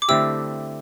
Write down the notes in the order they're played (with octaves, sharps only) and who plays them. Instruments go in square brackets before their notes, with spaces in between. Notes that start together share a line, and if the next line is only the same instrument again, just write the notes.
[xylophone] D6
[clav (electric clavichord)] D3 A3 C4 E4 G4 [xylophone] E6